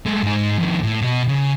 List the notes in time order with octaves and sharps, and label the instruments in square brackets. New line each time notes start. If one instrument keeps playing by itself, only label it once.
[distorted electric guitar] G#3 A3
G#2 D#4
F2 D#3
A2
B2 D#5
C#3